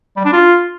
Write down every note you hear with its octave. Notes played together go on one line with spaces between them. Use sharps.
G3
D4
F4